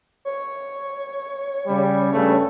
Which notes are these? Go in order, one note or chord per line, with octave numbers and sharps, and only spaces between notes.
C#5
C#3 G3
G2 C#3 A3